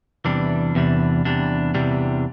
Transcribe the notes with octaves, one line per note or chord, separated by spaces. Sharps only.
E2 C3 E3 G3 D4
E2 C3 E3 G3 D4
E2 C3 E3 G3 D4
E2 C3 E3 G3 D4